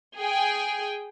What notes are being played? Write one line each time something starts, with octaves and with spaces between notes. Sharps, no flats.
G#4 G5